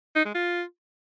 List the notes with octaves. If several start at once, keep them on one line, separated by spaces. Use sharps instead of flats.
D#4
G#3
F4